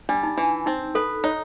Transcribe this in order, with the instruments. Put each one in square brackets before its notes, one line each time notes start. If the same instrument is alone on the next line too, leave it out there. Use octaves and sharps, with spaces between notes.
[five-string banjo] G3 [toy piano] D4
[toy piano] D#4
[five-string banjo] E3 [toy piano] D4
[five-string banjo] C4 [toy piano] D#4
[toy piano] A4 [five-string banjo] B4
[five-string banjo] D#4 [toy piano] C#5